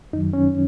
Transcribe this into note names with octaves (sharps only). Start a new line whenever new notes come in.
F#2 D#3 F#3 D#4
C#4